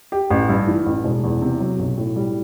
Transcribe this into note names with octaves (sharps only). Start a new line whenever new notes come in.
G4
A1
G2
E3
A1
E1
E2
C3
F#3
B1
A2
G3